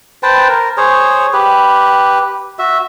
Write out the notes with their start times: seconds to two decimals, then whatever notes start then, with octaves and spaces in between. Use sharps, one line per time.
0.23 B4 C5 G5 A5
0.49 A#4
0.77 G#4 C5 C#5
1.33 G4 B4
2.59 F#4 E5